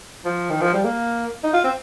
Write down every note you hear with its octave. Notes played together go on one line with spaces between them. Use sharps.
F3
D#3
F3
G3
A#3
D#4
F4
C4